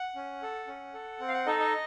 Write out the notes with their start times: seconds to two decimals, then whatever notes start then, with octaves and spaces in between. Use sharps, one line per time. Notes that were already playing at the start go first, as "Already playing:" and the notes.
Already playing: F#5
0.15 C#4
0.42 A4
0.67 C#4
0.94 A4
1.20 C4
1.28 F5
1.33 F#5
1.46 D#4 A4 D#5
1.60 D#5